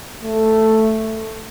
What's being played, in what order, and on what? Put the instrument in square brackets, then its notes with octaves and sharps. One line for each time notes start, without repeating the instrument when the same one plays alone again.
[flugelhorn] A3